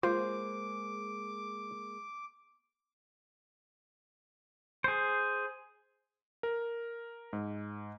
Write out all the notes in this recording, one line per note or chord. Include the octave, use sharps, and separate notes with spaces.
G#3 A#3 F4 G#4 C5 D6
G#4 C5
A#4
G#2